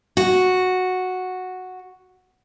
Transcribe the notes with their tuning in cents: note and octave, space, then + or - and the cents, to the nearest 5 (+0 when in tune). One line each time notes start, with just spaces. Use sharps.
F#4 -5